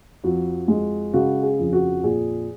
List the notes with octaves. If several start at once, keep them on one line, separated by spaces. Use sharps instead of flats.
F2 F#4
G#3
C#3 F#4
G#4
F2
F#4
A#2 G#4